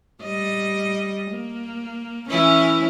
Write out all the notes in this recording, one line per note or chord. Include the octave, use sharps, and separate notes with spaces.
G3 D#5
A#3
E3 C#4 E4